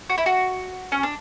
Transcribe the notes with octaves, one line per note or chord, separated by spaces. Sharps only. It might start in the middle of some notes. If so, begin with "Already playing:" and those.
F#4
E4
F#4
C#4
D4